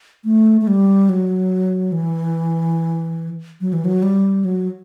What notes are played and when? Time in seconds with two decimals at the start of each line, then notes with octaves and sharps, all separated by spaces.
0.25 A3
0.61 A3
0.67 G3
1.09 F#3
1.92 E3
3.61 F#3
3.73 E3
3.85 F#3
4.03 G3
4.45 F#3